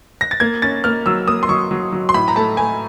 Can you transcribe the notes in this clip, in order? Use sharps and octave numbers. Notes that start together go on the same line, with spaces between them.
A#6
A6
A#3 G#6
C#4 A6
A#3 F6
F#3 E6
A#3 D#6
C6
F#3 C#6
F#3
F#3
C6
A2 B5
A#5
A3 A5
A3 G#5